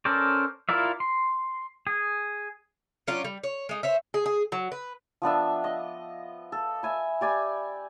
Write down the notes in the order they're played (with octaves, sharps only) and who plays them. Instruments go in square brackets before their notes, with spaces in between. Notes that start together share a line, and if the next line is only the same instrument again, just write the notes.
[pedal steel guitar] C#4 A4 A#4 C5 D5
E4 F4 A#4 D5 E5
C6
G#4
[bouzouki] F#3 C#4 D4 F4
G3
C#5
G#3 D#4
C5 C#5 E5
G#4
G#4
F#3
B4
[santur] F3 B3 D4 E5
D#5
A4
E5 G#5 B5
G4 D5 G#5 B5